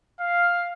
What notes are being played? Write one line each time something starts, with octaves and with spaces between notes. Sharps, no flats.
F5